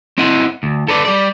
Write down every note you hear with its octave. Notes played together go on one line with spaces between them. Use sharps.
C4 E4 D#5 F#5
D2
A4 B4 D5
G3 D5